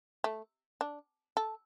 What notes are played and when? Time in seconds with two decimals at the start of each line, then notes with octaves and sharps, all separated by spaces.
0.24 A3
0.81 D4
1.37 A4